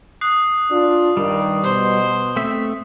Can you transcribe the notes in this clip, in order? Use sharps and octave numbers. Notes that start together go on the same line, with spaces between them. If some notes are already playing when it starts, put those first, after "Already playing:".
D#6 F#6 C7
D4 F4
G2 D#3 G3
B2 C5
A3 C4 E5